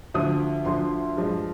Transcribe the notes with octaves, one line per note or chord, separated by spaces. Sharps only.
D2 D3 F3 D#6
D2 D3 F3 C6
G2 F3 G#3